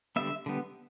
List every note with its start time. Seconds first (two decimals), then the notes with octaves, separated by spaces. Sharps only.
0.16 D3 G3 B3 E5
0.46 D3 G3 B3